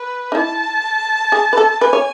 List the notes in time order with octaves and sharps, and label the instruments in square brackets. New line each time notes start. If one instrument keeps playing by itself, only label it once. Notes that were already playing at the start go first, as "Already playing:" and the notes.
Already playing: [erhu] B4
[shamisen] D#4
[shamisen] E4 [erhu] A5
[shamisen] G#4
B4
A4
[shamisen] B4 [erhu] G#5
[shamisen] C#5